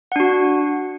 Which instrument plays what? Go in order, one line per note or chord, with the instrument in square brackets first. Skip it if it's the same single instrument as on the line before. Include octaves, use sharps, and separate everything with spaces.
[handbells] F#5
D4
F#4